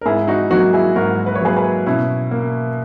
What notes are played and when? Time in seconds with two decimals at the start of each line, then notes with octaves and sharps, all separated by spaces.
0.01 A#4
0.06 G#2 E4 G#4
0.27 D#4 F#4
0.50 F#3 A#3 D#4 F#4
0.73 E4 G#4
0.96 G#2 F#4 A#4
1.26 B4
1.35 C#5
1.41 F#3 A#3 G#4 B4
1.56 G#4 B4
1.86 B2 C#4 E4
2.31 A#3